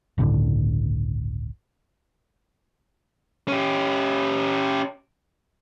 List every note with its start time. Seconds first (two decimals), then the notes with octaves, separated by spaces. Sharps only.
0.18 G1 C#2 A2 D3
3.48 C#4 G4